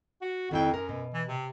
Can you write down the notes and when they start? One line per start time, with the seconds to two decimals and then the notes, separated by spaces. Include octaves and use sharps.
0.22 F#4
0.51 F2 D#3 E4 G5
0.74 F#2 A#4
0.89 B2
1.13 E3
1.27 C3